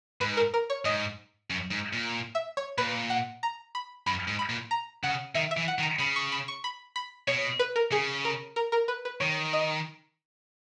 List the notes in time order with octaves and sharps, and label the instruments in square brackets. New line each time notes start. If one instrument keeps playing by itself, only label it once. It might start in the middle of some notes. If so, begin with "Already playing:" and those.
[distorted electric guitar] G#2 [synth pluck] B4
[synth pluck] A#4
A#4
C#5
[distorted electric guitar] G#2 [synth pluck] D#5
[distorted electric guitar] F#2
G#2
A#2
[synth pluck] E5
C#5
[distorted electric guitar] A#2 [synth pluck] B4
[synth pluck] F#5
A#5
B5
[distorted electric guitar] F#2 [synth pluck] B5
[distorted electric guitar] G#2
[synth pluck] B5
[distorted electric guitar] A#2
[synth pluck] A#5
[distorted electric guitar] C#3 [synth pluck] F#5
[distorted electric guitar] D#3 [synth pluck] E5
[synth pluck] E5
[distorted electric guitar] E3
[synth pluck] F#5
[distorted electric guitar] D#3
[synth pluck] A#5
[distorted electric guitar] C#3 [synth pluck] B5
[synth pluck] C#6
B5
C#6
B5
B5
[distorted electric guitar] B2 [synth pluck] C#5
[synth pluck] B4
A#4
[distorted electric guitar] C#3 [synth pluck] G#4
[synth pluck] A#4
A#4
A#4
B4
B4
[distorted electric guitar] D#3 [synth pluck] C#5
[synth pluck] D#5